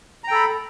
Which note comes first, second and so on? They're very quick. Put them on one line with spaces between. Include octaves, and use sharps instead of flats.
A#5 G5 A4 B5